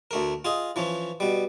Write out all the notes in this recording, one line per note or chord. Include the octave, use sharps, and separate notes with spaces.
D2 A3 A#4
F4 G#4 D#5
E3 F3 C#4
B2 G3